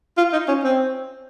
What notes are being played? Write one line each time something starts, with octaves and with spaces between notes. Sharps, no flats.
F4
D#4
C#4
C4